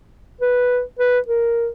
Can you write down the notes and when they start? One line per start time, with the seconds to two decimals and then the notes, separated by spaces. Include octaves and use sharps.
0.41 B4
0.99 B4
1.28 A#4